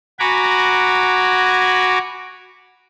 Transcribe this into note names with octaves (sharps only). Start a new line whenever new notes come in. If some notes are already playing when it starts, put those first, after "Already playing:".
F#4 F#5 G#5 A#5 B5 D6